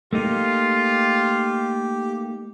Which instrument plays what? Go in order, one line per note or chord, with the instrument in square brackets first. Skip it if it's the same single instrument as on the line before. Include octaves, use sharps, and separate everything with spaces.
[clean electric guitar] A3 A#3 D#4 [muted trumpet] F4 [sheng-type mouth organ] G4